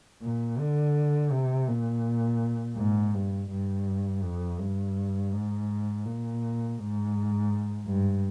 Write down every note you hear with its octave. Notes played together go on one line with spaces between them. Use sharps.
A#2
D3
C3
A#2
G#2
G2
G2
F2
G2
G#2
A#2
G#2
G2